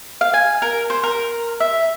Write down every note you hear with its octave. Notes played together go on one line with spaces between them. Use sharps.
F5
G#5
A#4
C5
A#4
E5